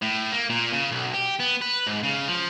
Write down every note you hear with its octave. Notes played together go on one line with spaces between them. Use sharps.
A2
A#3
A#2
C#3
B1
G4
B3
B4
G#2
C#3
F3